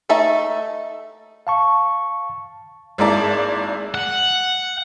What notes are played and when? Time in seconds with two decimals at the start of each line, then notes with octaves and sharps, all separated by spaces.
0.09 A3 D#4 E5 A5
1.47 F5 A5 C#6
2.98 G#1 G#3 A#3 E4 D5 A5
3.94 F#5